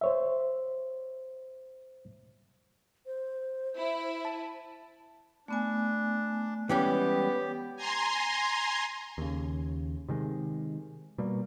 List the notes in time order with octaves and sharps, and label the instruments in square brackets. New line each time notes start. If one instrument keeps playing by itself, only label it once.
[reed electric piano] C5 C#5 E5
[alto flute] C5
[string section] E4
[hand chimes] A5
[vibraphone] A3 B3 G#5 [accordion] D4
[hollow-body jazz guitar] E3 G3 C#4 [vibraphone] G#3 C#5 G5 [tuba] B3 [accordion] G4
[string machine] G#5 A#5 C6
[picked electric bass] D#2 C#3
C3 D#3 G#3
B2 G3 A#3